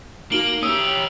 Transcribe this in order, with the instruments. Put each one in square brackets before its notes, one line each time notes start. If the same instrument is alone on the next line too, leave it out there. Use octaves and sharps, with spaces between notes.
[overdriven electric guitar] A#3 [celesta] D#4 F#4 [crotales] D7 F#7 G7
[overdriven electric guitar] C#4 G4 [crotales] D#6 [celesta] E6